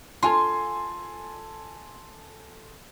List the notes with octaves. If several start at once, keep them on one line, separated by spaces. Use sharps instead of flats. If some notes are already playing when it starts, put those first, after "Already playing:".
F4 A4 G#5 C6